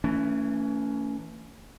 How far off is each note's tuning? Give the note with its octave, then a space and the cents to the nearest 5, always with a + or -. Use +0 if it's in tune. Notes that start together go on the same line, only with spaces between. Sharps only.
E3 +0 A3 +40 C#4 +20